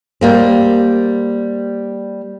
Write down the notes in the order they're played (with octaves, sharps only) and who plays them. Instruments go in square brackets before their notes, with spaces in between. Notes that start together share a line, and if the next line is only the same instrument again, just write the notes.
[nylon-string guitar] G3 A#3 C4